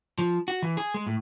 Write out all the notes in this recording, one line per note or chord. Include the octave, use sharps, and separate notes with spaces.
F3
F#4
E3
G#4
G#3
A2